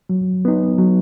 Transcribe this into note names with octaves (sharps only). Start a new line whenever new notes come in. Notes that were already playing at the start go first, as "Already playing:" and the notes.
F#3
B3 D#4
F#3